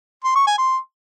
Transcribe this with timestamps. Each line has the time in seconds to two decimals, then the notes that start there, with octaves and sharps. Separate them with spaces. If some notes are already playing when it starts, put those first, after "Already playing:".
0.24 C6
0.36 C#6
0.47 G#5
0.58 C6